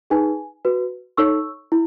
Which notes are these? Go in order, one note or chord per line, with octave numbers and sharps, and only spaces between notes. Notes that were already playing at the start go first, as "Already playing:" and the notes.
D#4 G#4 B4 G#5
F#4 B4
D#4 A4 C#5 C#6 E6
E4